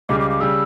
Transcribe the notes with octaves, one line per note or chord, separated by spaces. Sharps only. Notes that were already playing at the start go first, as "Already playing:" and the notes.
C#2 C#3 G3 D6
D6
D6
C#3 G3 E6